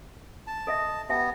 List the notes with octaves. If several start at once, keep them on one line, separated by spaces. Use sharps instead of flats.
A5
A4 D#5 E5
B3 G4 E5 G5